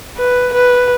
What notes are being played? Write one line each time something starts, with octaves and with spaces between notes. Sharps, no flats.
B4
B4